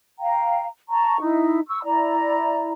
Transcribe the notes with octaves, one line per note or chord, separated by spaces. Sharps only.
F5 G5 A#5
A5 A#5 C#6
D#4 E4
C#6 E6
E4 D5 A#5